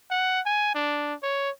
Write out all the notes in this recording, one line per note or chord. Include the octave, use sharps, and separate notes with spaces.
F#5
G#5
D4
C#5